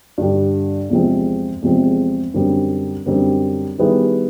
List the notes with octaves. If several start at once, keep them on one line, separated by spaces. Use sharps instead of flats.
G2 D3 G3
E2 C3 F3 G#3 C4
E2 C3 F3 G#3 C4
F#2 D3 G3 C4
F#2 D3 G3 C4
D#3 G3 B3 E4 G#4